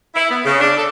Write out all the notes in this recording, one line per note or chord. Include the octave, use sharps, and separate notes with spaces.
E4
B3
C#3
D4
A4